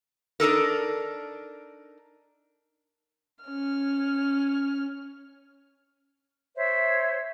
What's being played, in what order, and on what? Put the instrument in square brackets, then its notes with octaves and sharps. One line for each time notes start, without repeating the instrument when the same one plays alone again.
[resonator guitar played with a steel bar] D4 D#4 A4 A#4
[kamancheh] C#4 F6
[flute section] C5 C#5 E5